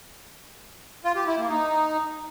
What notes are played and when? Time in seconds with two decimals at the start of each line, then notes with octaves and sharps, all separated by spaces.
1.04 F4
1.16 G4
1.27 E4
1.38 A#3
1.49 D#4